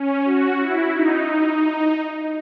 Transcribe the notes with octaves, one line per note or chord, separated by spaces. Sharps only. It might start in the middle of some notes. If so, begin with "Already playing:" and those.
Already playing: C#4
F#4
E4
D#4